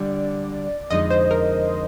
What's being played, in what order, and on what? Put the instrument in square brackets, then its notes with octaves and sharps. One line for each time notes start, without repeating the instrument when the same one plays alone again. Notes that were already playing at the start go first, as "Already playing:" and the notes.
Already playing: [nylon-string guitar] D3 G3 D4 [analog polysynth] D5
[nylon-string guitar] F2 D3 G#3 C4 D#4 [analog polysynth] D#5
[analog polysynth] C5
A#4